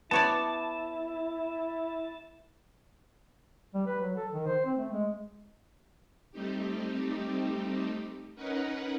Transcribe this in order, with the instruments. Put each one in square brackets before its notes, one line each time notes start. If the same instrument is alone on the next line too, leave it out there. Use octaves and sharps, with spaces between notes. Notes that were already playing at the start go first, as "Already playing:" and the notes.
[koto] B3 C#5 D5 [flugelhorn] E4 [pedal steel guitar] A5
[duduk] G3
B4
F#3
A4
D#3
C5
C4
A3
G#3
[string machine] G3 A3 C4 D#4 G4
C#4 D#4 A#4 B4 F#5